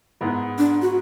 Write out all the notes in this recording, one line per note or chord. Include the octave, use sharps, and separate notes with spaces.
G#2 G#3 B3 E4
D4
F#4